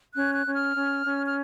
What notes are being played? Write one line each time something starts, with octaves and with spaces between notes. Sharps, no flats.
C#4 F#6
F#6
C#4
F6
C#4
C#4
F6